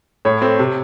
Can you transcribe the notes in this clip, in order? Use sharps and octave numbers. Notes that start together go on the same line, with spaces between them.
A2 C#5
A3 C4
C3